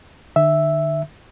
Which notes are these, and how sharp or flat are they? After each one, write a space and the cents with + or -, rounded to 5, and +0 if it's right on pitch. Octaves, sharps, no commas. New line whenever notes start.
D3 +45 E5 +0